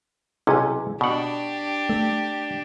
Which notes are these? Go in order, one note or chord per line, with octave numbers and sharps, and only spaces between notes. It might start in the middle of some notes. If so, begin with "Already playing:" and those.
B1 C3 C#4 E4 G#4 G#5
B2 D4 G4 F#5
A3